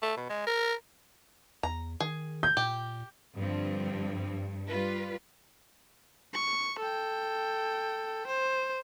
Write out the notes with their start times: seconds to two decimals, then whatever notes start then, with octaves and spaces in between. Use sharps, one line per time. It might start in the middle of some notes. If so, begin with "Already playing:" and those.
0.02 A3
0.17 B2
0.30 G#3
0.47 A#4
1.63 E2 A#5
2.00 D#3 G#4
2.43 G6
2.57 A#2 G4
3.37 G2 D3 F3 C4
4.68 G3 F4 B4
6.33 C#6
6.79 A4 G5
8.27 C5